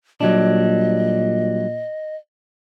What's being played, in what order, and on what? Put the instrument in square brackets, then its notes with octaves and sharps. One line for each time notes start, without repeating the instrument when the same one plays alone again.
[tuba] A#2 [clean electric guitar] F#3 G3 D4 [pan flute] D#5